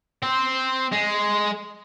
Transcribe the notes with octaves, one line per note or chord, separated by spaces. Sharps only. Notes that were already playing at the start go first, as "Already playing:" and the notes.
C4
G#3